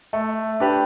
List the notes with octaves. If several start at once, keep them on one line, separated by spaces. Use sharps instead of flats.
A3
D4 G4 B4